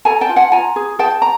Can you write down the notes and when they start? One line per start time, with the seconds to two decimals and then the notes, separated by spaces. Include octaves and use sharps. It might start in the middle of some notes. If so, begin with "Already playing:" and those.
0.05 A4 G#5 A#5
0.21 G5 A5
0.29 F4
0.36 F#5 G#5
0.52 F4 G#5 A#5
0.76 G#4
0.99 G#4 G5 A5
1.22 A#5